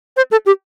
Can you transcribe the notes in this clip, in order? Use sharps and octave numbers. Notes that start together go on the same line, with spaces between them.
C5
A4
G4